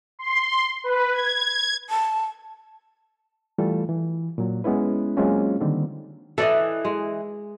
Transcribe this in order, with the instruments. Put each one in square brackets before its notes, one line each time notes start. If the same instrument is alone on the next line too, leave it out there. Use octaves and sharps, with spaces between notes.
[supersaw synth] C6
B4
G#6
[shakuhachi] A5
[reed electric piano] E3 G3 A3 F4 A4
E3
A#2 F#3
G#3 B3 C#4 E4 B4
F#3 G#3 A#3 C4 C#4 F4
D3 D#3 G3 A#3 C4
[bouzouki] E3 [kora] A4 D5 D#5
[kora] G#3